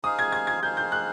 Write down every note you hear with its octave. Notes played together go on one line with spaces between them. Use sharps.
D#4 G#4 C5 F5 D#6
G#6
G#6
G#6
D#4 G#4 C5 F5 G6
G6
F#6